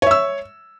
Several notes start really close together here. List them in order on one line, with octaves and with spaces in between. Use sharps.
C#5 E5 E6